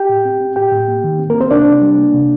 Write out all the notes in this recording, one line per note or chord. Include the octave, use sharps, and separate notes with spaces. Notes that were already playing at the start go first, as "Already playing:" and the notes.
Already playing: G4 G5
A2
C4
C4
A2 G4 G5
A2
A#3
D#3
C4
A#3 C4 A#4
C4 C5
C3 D4 D5
C3
G3
A#3
C3